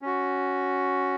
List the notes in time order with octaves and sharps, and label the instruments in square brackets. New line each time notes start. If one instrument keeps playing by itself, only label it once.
[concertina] C#4 F#4